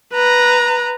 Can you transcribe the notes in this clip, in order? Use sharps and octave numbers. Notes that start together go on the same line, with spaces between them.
B4 A#5